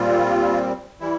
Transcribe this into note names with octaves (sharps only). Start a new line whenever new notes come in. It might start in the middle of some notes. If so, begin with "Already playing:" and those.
Already playing: A#2 G3 C4 F4
E3 G3 E4